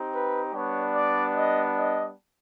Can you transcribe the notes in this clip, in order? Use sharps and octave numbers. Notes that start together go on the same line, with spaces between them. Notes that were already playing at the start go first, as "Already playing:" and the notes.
Already playing: C4 D#4 G4
B4
G3 B3 D4 C#5
D5
D#5
D#5